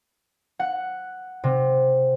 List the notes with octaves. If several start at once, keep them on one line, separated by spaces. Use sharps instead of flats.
F#5
C3